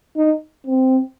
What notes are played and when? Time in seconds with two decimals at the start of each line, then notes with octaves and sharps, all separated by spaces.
0.16 D#4
0.67 C4